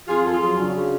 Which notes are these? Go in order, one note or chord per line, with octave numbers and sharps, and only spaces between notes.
F2 F4 G#4
F2 A4
F4 G#4
F#3
C#3 D4 F#4
C#3